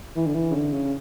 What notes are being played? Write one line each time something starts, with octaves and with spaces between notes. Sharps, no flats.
E3
D3
E3
C#3
D3
C#3